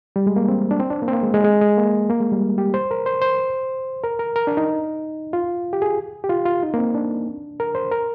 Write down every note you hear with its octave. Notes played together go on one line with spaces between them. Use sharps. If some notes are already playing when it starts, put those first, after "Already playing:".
G3
G#3
A#3
C4
D4
C4
D4
A#3
C4
A#3
G#3
G#3
G#3
G#3
A#3
A#3
G#3
G3
G4
C5
A#4
C5
C5
A#4
A#4
A#4
D4
D#4
F4
G4
G#4
G4
F4
F4
D#4
A#3
C4
D4
A#4
C5
A#4